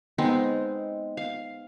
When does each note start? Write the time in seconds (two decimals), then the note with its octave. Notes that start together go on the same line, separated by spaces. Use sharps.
0.18 G#3 B3 C4 D#4
1.17 F5